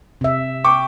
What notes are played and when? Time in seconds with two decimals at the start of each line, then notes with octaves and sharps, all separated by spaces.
0.21 C3 E5
0.64 G5 C#6 D6